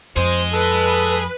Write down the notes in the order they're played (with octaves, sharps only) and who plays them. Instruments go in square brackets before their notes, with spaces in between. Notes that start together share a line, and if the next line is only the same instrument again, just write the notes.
[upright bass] F2 [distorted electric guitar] G#4 D#5 [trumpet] C5
[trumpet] A4 [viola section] B4